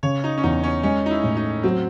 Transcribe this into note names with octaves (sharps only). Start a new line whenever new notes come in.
C#3 C#5
D#4
C#4
E2 D#4
C#4
G#3 C#4
D#4
E4
A2
D#4
F#3 C4